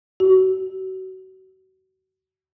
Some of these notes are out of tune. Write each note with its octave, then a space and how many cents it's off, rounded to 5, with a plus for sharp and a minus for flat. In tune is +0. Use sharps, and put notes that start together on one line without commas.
F#4 +35